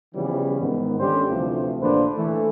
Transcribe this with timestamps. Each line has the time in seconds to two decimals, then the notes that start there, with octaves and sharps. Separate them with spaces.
0.15 C#3 E3 F3 G3 B3 C#4
0.60 G#2 D#3 B3
0.99 D3 G3 C#4 G4 C5
1.29 D2 C3 E3 F3 A3
1.81 A#1 D3 A#3 D4 B4 C5
2.17 E3 A3 A4